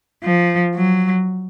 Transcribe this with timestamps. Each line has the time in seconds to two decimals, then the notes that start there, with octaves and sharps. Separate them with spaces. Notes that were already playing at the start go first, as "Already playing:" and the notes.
0.24 F3
0.75 F#3